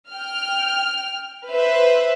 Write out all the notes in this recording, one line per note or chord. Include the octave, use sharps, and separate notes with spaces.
G5 F6
B4 C5 E5